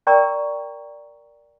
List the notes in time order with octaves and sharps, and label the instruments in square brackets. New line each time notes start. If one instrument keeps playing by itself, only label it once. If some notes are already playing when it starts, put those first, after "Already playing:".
[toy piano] A#4 D5 G5 A#5 C#6